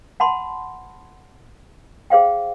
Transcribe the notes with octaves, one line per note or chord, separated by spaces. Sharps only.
F#5 A5 B5 C6
G#4 C5 F5 G5